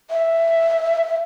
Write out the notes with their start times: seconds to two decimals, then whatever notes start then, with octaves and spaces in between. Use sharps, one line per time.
0.11 E5